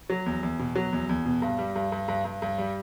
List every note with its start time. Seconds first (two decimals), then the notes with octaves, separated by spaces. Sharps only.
0.10 F#3
0.26 E2
0.43 E2
0.59 B2
0.75 F#3
0.93 E2
1.09 E2
1.25 B2
1.42 G2
1.58 G3
1.76 G2
1.92 G2
2.08 G2
2.25 G2
2.42 G2
2.58 G3